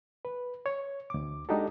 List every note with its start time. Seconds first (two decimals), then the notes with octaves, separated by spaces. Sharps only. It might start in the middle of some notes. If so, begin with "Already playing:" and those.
0.25 B4
0.66 C#5
1.10 D2 D6
1.49 G#3 D4 D#4 F#4 G4 A4